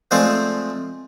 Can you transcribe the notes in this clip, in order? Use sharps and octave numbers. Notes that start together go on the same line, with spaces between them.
F3 G#3 A3 C4 C5 D5